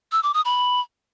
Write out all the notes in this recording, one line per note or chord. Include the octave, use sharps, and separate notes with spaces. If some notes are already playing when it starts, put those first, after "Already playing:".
E6
D6
D#6
B5